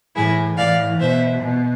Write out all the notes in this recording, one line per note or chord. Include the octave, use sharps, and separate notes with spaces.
A2 E3 E4 G#4
A2 E3 D5 F5
B2 C5 E5
B2